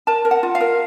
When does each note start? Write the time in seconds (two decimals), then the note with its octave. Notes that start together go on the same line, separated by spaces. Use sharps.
0.07 A#4 A5
0.25 A#4
0.31 F#5
0.43 F4
0.55 F5
0.61 A#4